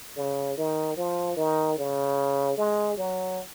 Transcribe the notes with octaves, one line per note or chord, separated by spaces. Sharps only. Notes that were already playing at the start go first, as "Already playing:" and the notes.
C#3
D#3
F3
D#3
C#3
G#3
F#3